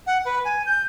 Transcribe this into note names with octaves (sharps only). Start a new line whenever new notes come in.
F#5
B4
G#5
G6